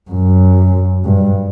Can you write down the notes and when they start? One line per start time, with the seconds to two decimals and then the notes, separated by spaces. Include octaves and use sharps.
0.10 F#2
1.05 G2